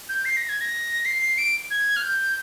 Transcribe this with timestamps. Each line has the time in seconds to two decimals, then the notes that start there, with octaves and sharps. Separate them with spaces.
0.09 G6
0.25 C7
0.37 A#6
0.49 G#6
0.61 A#6
1.05 C7
1.22 C7
1.38 D7
1.71 G#6
1.96 F6
2.03 G6